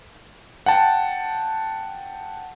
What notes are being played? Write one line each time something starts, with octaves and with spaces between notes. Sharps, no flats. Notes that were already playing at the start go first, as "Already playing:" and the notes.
F#5 G5 A5